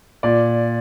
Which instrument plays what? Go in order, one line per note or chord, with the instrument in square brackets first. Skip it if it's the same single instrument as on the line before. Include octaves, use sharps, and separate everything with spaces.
[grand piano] A#2 D5